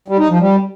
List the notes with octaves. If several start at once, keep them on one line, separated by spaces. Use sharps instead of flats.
G3
D#4
F3
G3